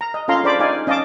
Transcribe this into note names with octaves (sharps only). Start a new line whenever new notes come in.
A#5
D#5
C#4 F4 A4 F5 A#5 C6
D4 G#4 C5 D5 B5 D6
D#4 D5 F5 G#5
C#4 D#5 F5 A5 D6